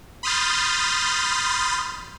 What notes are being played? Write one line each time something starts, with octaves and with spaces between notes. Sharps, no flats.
B5 C6 D#6 F6 G6 A6